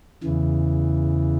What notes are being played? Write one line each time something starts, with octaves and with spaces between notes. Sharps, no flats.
E2 C#3 E3